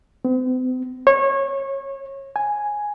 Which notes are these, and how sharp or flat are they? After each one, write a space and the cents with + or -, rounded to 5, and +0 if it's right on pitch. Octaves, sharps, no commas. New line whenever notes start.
C4 -45
C#5 -25
G#5 +0